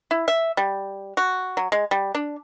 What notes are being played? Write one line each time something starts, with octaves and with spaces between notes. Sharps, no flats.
E4
E5
G3
F#4
F#3
G#3
G3
D4